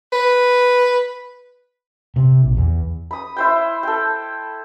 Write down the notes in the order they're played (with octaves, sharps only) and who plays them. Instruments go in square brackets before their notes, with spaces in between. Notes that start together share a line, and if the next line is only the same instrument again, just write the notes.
[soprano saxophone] B4
[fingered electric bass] C3
A#1
E2
[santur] B5 D#6
E4 C5 G5
A4 G5